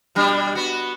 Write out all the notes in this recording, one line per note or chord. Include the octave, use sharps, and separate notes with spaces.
B2 G3 D4
B3 F#4